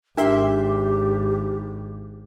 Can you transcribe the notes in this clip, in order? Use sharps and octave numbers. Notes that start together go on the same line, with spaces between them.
G#1 D4 G4 A#4 E5 C6